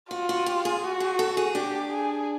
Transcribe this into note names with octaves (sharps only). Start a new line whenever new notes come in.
F4 F#4
F#4
G4
G#4
F#4
G#4
A4
G#4
D4 G4
G#4